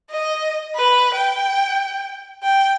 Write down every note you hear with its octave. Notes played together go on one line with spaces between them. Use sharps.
D#5
B4
G5
G5